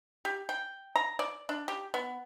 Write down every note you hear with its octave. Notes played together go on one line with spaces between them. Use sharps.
G4
G5
A#5
D5
D4
G4
B3